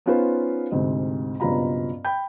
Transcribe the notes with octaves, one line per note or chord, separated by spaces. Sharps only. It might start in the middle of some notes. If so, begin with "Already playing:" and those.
B3 C#4 D#4 F4 B4 C5
D2 G#2 C3
F#1 G2 B2 F4 A#5 B5
G5 B5 G6